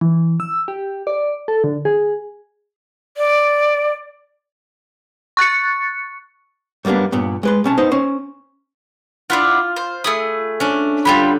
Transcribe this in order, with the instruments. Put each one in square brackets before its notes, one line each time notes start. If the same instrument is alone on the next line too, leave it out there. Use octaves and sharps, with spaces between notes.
[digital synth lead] E3
E6
G4
D5
A4
D3
G#4
[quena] D5
[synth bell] C#6 F#6 A6 C#7
[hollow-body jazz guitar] F#2 G3 A#3 B3 D4
G2 A#2 B3
G#3 B4 C6
B1 C#4 A5
B3 D#4 C5
C#4 C5
[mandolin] D4 E4 F#5 [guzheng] F4
[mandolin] C5
[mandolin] A3 G#4 D#6 [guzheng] B5
[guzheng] C#4 D4
[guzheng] D3 G3 [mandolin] F4 G4 B5